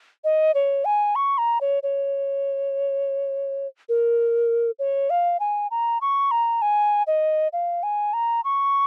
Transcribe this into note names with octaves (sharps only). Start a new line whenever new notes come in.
D#5
C#5
G#5
C#6
A#5
C#5
C#5
A#4
C#5
F5
G#5
A#5
C#6
A#5
G#5
D#5
F5
G#5
A#5
C#6